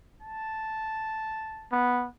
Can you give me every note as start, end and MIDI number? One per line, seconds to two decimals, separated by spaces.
0.22 1.73 81
1.72 2.07 59